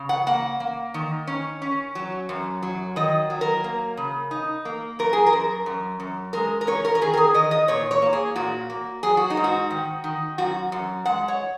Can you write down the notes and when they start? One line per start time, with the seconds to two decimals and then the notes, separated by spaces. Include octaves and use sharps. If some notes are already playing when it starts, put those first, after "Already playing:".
Already playing: C#3
0.09 F#5
0.27 A#3 F#5
0.60 A#3
0.94 D#3
1.27 C#4
1.62 C#4
1.95 F#3
2.29 F#2
2.63 F#3
2.96 D#3 D#5
3.30 F#3
3.41 A#4
3.64 A#3
3.97 C#3
4.31 D#4
4.65 A#3
4.99 F#2 A#4
5.13 G#4
5.26 A#4
5.33 F#2
5.66 F#2
6.00 F#2
6.33 G#3 A#4
6.61 A#4
6.67 C#4 C#5
6.85 A#4
6.95 A#4
7.01 D#3 G#4
7.13 A#4
7.17 G#4
7.34 D#3 D#5
7.51 D#5
7.68 A#2 C#5
7.91 C#5
8.02 A#3
8.13 G#4
8.36 A#2 F#4
8.70 A#3
9.03 F#3 G#4
9.17 F#4
9.30 D#4
9.37 G#2
9.44 F#4
9.71 D#3
10.04 D#3
10.38 F#2 F#4
10.72 F#2
11.06 G#3 F#5
11.28 C#5